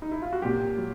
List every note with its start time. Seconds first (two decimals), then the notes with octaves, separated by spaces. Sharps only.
0.02 D#4
0.11 E4
0.22 F4
0.33 F#4
0.42 A#2 F#3 G4
0.78 F#3